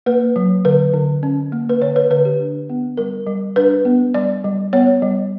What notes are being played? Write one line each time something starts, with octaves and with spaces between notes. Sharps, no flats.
A#3 B4
F#3
D3 B4
D3
C#4
A#3
B4
D3 C#5
B4
D3 B4
G4
D4
B3
G3 A#4
G3
D4 B4
B3
G3 D5
G3
B3 C#5
G3